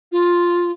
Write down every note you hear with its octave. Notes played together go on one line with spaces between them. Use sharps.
F4